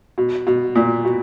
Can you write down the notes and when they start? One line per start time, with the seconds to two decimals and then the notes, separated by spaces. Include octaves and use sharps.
0.18 B2
0.47 B2
0.75 A#2
1.05 B2